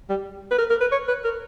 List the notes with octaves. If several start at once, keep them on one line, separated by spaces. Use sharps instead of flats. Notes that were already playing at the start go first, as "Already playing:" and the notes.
G3
B4
A#4
A#4
B4
C#5
B4
A#4